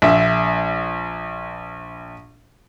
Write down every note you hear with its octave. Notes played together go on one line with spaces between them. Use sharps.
A#1 E5